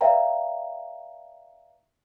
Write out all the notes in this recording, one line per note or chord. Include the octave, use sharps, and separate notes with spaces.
B4 D5 E5 F5 G5 A#5